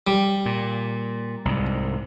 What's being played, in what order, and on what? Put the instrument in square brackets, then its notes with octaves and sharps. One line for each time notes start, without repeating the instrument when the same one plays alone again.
[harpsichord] G3
[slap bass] A#2
C2 G#2 C3